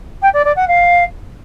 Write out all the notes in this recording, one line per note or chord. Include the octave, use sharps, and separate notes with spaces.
G5
D5
D5
F#5
F5